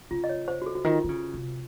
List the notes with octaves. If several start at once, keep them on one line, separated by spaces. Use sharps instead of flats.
C#3 F4
D#5
C#5
C5
F#4
A4
F#4
D#3 F4
D#3
C#3
C3